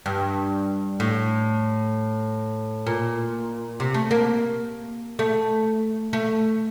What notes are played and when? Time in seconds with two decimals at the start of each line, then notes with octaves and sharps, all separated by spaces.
0.06 G2
1.00 A2
2.87 A#2
3.80 C3
3.94 A3
4.11 A#3
5.19 A3
6.13 A3